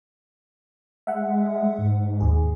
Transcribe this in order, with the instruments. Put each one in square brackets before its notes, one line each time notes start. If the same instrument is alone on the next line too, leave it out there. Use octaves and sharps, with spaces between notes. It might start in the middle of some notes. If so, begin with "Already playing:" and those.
[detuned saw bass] G#3 [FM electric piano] E5 F#5
[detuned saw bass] G#2
[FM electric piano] D#2 G#4